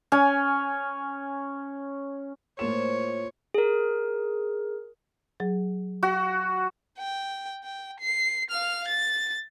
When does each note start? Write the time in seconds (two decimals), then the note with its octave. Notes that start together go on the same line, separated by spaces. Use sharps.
0.12 C#4 G#5
2.59 A2 A#3 F4 C5 C#5 A5 E7
3.54 G#4 A#4
5.40 F#3 G#4
6.03 F#4
6.98 G5
7.64 G5
8.00 C7
8.50 F5 F6
8.88 A6